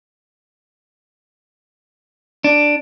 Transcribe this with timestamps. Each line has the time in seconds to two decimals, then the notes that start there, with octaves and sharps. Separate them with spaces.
2.44 D4